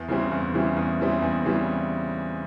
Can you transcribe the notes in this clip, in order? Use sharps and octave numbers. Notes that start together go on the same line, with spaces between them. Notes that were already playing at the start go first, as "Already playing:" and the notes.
Already playing: E2
C#3 E3 G3 C4
E2
C#3 E3 G3 C4
E2
C#3 E3 G3 C4
E2
C#3 E3 G3